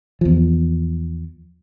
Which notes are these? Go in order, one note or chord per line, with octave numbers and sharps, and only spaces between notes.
E2 F3